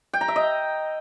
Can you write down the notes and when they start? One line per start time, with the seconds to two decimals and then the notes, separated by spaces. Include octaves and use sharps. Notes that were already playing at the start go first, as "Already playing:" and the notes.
0.13 G5
0.21 A#5
0.28 E5
0.36 D#5